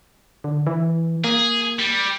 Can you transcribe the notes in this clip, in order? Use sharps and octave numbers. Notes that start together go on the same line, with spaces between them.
D3
E3
A#3 G#4
G3